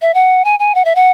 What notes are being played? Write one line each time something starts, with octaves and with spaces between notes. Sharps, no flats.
E5
F#5
G#5
G#5
F#5
E5
F#5